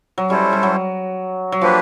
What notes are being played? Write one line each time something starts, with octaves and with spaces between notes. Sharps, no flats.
F#3
G3 C#4 E4 A4 C5
G3
F#3
F#3
F3 A#3 D4 G4 B4